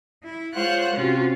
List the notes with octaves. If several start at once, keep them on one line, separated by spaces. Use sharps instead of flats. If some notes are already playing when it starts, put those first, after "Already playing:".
E4
G#3 F4 C5 C#5 F#5 F#6
C3 C#4 F4 F#4